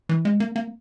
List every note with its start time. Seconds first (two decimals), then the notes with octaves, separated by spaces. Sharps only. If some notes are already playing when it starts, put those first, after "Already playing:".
0.09 E3
0.25 G#3
0.40 A#3
0.56 A#3